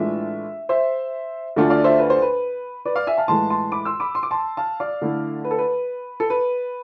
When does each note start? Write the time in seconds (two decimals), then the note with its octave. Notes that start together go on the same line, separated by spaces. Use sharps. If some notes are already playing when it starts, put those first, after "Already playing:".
Already playing: A2 E3 G#3 D4 F4 E5
0.69 C5 E5
1.56 D2 D3 A3 D4 F4
1.70 D5 F5
1.84 C5 E5
1.99 B4
2.10 C5
2.22 B4
2.85 B4 D5
2.96 D5 F5
3.07 E5 G#5
3.18 F5 A5
3.28 A2 E3 G#3 A5 C6
3.50 A5 C6
3.72 B5 D6
3.85 C6 E6
4.00 B5 D6
4.15 C6
4.23 D6
4.31 A5 C6
4.57 F5 A5
4.80 D5 F5
5.02 D3 A3 E4
5.44 B4
5.51 A4
5.58 B4
6.20 A4
6.30 B4